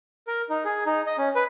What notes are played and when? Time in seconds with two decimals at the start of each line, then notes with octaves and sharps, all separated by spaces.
0.27 A#4
0.50 D#4
0.65 G#4
0.86 D#4
1.07 D#5
1.18 C#4
1.35 B4